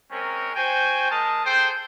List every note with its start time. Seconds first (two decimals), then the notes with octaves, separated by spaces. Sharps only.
0.11 G#3 C4 C#4 A#4
0.55 F#4 C5 G5 G#5
1.11 G#3 A#4 A5 D#6
1.45 G#4 A4 C5 G5